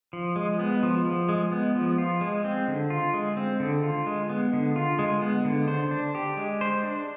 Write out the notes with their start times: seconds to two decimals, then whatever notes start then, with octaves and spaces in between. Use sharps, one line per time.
0.13 F3
0.36 G#3
0.59 B3
0.83 F3
1.05 F3
1.29 G#3
1.52 B3
1.75 F3
1.98 F4
2.21 G#3
2.44 C4
2.68 D3
2.90 F4
3.14 G#3
3.37 C4
3.60 D3
3.83 F4
4.06 G#3
4.29 B3
4.53 D3
4.76 F4
4.99 G#3
5.22 B3
5.45 D3
5.68 C5
5.91 D4
6.15 G4
6.37 G#3
6.61 C5
6.83 D4